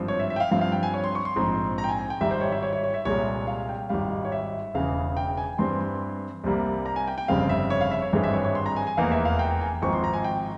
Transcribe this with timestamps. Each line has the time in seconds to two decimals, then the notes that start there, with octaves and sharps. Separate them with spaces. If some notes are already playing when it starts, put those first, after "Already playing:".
Already playing: G#1 G2 F3 C4
0.08 C#5
0.20 E5
0.30 E5
0.36 G5
0.40 F5
0.51 G2 F3 C4 F5
0.61 F5
0.72 G5
0.83 G#5
0.94 C#5
1.04 C6
1.15 C#6
1.25 C6
1.36 A#1 G#2 F3 C4
1.78 A#5
1.84 G5
1.89 G#5
1.99 G#5
2.10 G5
2.21 G#1 G#2 G3 E5
2.31 C5
2.41 C#5
2.52 E5
2.63 C#5
2.73 C#5
2.84 C#5
2.94 E5
3.05 C2 A#2 G#3 C#5
3.47 F5
3.69 G5
3.89 G#1 G#2 G3 F5
4.25 C#5
4.32 E5
4.74 E1 E2 C#3 E3 F5
5.17 G5
5.37 G#5
5.58 G2 E3 G3 C4 C6
5.81 C6
6.44 C2 C3 G3 A#3
6.86 A#5
6.96 G#5
7.07 G5
7.18 G5
7.28 G1 F2 C#3 G3 C4 F5
7.49 E5
7.70 C#5
7.81 F5
7.91 E5
8.02 C#5
8.13 G#1 G2 E3 G#3 C4 C#5
8.24 E5
8.33 C#5
8.44 C#5
8.55 C6
8.66 A#5
8.76 G#5
8.87 G#5
8.97 F1 E2 E3 A#3 F5
9.11 E5
9.25 F5
9.39 G5
9.61 G#5
9.82 G#1 G#2 F3 C4 C#6
9.93 C6
10.04 A#5
10.13 G#5
10.24 G5